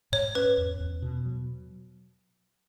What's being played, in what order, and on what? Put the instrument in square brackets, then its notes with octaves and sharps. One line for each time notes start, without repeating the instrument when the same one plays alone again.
[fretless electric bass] G#2 [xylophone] C#5
[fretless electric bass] C#4 [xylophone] B4
[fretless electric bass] E2
E2
B2
F#3